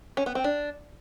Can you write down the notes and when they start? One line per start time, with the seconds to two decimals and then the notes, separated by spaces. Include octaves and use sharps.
0.17 C#4
0.26 B3
0.35 C4
0.44 D4